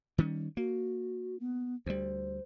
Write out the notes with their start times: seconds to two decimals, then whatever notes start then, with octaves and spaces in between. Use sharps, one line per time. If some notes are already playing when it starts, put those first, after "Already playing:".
0.18 D#3 G3 C#4
0.57 A#3 F#4
1.40 B3
1.86 D2 G3 C5